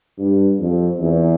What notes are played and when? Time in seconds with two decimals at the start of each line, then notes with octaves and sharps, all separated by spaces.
0.19 G2
0.60 F2
1.00 E2